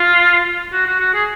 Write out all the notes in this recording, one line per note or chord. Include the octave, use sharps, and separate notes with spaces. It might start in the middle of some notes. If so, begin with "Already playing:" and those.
Already playing: F4
F#4
F#4
F#4
G#4